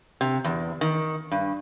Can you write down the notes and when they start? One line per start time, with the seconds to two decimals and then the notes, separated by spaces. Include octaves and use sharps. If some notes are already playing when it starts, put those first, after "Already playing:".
0.21 C3
0.44 E2
0.81 D#3
1.31 G2